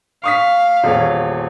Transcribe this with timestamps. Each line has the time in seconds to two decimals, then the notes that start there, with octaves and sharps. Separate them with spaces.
0.24 F5 C#6 D#6 B6
0.84 D#1 E2 C#5